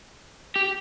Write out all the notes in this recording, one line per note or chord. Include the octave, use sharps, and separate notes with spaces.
G4